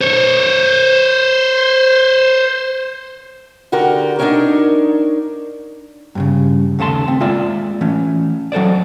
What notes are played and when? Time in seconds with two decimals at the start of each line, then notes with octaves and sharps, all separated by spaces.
0.01 C5 C#5
3.72 D3 F#4 G4 A#4
4.19 D4 D#4 F4 G#4 A#4 C#5
6.15 G2 A#2 C#3
6.79 D#2 C#3 A3 A5 C6
7.08 C4
7.20 G#3 A#3 F4 D5 E5
7.81 E3 A3 C#4
8.52 F#3 A4 C5 D5